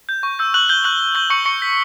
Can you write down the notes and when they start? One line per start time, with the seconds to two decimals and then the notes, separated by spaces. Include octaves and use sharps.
0.09 G6
0.23 C#6
0.39 E6 G6
0.54 C#6 F#6 F#7
0.69 G6 G7
0.84 C#6 F#6 F#7
1.00 F#6
1.15 C#6 G6 G7
1.30 C#6 F#6 C#7
1.46 C#6 C#7
1.61 G6 B6